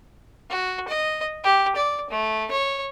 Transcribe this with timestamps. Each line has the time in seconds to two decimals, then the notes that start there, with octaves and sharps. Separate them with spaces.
0.50 F#4
0.88 D#5
1.44 G4
1.76 D5
2.10 A3
2.51 C#5